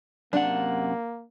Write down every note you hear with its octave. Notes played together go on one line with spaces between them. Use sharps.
F#2 C3 A#3 D4 F#5